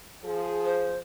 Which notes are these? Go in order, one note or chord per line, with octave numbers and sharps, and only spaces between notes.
F3 G#4
C5